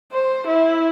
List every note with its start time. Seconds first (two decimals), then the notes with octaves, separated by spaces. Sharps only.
0.12 C5
0.48 E4